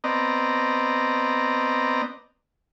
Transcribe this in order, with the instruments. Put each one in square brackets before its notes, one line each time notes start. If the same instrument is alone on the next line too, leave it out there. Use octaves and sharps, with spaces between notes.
[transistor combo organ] B3 C4 D5 D#5 A#5